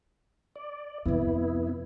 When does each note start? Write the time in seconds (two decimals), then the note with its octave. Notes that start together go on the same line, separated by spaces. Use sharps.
0.56 D5
1.06 F2 C3 B3 E4